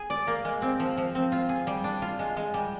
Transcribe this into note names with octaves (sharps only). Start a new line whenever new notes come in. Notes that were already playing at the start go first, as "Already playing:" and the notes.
Already playing: G#4
D5
A#3
G#3
C4
F3
F3
C4
F4
G#4
G3
D4
F4
G#3
G#3
G3